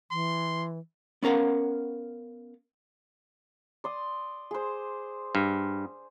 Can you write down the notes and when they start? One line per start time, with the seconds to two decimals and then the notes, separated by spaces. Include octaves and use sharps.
0.11 E3 C6
1.23 B3 C#4 A#4 F5 F#5
3.84 D5 C6 D#6
4.51 G#4 C5
5.35 G2